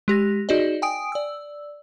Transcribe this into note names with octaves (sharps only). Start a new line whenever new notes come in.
G#3 G4 A#6
D#4 F#4 G#4 D5 D#5
G5 G#5 D#6 D7
D5 E6